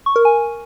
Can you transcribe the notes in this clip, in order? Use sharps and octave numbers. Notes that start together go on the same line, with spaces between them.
C#6
A#4
G#5